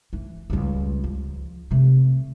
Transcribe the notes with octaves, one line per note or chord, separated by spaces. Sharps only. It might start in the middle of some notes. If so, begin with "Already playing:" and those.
E3
C#2 G3
F3
C3 A3